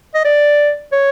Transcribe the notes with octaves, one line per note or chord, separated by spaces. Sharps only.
D#5
D5
C#5